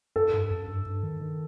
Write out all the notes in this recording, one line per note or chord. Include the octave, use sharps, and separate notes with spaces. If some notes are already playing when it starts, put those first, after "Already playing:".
F#2 A4
G2
F#2
G2
G2
D#3
D#3